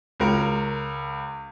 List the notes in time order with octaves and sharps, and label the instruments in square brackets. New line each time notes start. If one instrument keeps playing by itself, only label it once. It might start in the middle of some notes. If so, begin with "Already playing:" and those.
[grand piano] C#2 A#4